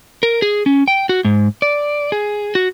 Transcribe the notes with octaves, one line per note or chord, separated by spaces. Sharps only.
A#4
G#4
C#4
G5
F#4
G#2
D5
G#4
F#4